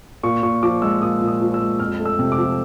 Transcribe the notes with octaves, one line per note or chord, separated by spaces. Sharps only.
A#2 C#6
A#2 C#6
F3 D6
G#3 E6
A#2 D#6
A#2
D#6
F3
E6
G#3
F2 F6
A3
E6
C3
D6
F3